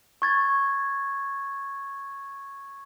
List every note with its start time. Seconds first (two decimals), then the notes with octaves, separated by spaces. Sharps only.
0.22 C#6 G#6 A6